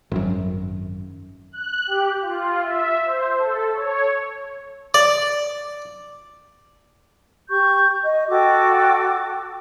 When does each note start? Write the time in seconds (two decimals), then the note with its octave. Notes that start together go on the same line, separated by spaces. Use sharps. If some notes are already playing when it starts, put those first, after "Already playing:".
0.11 G#1 F#2
1.52 F#6
1.87 G4
2.22 F4
2.62 E5
3.05 C5
3.38 A4
3.74 C#5
4.94 D5
7.49 G4 C#6 G6
8.04 D#5
8.30 F#4 A4 G5 D6